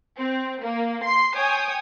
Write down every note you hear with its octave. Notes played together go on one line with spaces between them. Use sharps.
C4
A#3
C6 C7
C#5 G5 G#5 D#6